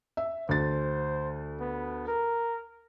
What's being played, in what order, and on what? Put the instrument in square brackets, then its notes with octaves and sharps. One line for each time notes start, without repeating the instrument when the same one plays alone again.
[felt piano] E5
[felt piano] D2 A6 [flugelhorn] C5
[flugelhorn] B3
A#4